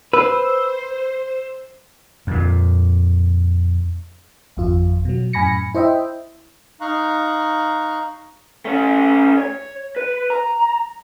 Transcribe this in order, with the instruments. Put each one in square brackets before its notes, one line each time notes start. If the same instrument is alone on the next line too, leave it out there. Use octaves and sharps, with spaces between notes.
[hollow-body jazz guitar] B4 [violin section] C5 [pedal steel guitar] E6
[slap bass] F2 A#2
[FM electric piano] G#1 F2 F4
B2 F#3
F#2 A2 G#5 B5 A#6 C#7
E4 C5 D#5 E5 G5
[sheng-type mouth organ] D#4 F5 A#5 C#6 F#6
[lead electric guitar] A3 C#4
C#5
B4
A#5